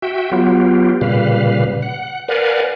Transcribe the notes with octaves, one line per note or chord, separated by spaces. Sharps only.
F#4 E5 G5
F#3 B3 F4 G4
A#2 C#3 G3 B4 F5
F#5
A#4 B4 D5 F5 F#5 G#5